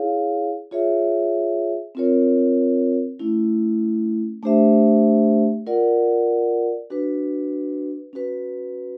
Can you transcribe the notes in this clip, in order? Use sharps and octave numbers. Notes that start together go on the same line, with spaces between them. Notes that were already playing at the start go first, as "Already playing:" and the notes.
Already playing: E4 G#4 C#5 F5
F4 G#4 C#5 E5
C4 F4 A#4 C#5
A3 C#4 E4
A3 D4 G4 C5 E5
F4 A#4 D5 F#5
D4 F#4 B4
C#4 F#4 B4